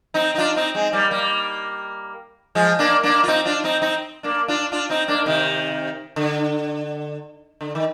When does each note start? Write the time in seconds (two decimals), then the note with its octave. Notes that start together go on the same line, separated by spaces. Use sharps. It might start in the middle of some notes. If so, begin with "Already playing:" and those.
0.14 C4 D#4
0.35 D#4
0.38 D4 F4
0.56 C4 D#4
0.74 G#3 C4
0.93 G3 A#3
1.11 G3 A#3
2.55 F3 G#3
2.79 A#3 D4
3.03 A#3 D4
3.23 F4
3.28 C4 D#4
3.45 D4 F4
3.64 C4 D#4
3.82 C4 D#4
4.23 A#3 D4
4.48 D4 F4
4.72 D4 F4
4.90 C4 D#4
5.08 A#3 D4
5.26 C3 D#3
6.16 D3
7.61 D3
7.75 D#3